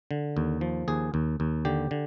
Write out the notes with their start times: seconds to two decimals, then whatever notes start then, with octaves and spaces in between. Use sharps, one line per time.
0.11 D3
0.37 D#2
0.61 F3
0.88 D#2 G#4
1.14 D#2
1.40 D#2
1.65 D3 G4
1.91 D3